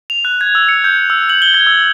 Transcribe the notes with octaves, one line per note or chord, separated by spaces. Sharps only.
F7
F#6
G#6
E6
C#7
G6
E6
F#7
G7
G#6
E6